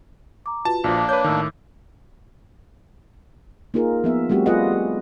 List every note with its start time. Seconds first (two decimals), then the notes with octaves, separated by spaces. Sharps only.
0.46 A#5 D6
0.65 F4 F#4 B4 A5
0.84 A#1 F3 A#3 D4
1.09 B4 C#5 G6
1.24 A2 D#3 D6 E6
3.74 A#3 D#4 F4 G#4 A#4
4.04 F3 B3 E5
4.30 G3 A3 C4 F#4 G4
4.46 F4 G#4 B4 D#5 F#5
4.73 F4